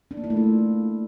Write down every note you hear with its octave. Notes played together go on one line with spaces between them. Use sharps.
D4
A#3
E4
A3
F4